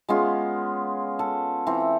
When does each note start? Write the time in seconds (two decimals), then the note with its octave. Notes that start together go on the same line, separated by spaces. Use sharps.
0.08 G#3 B3 C#4 F4
1.19 A4
1.67 E3 C4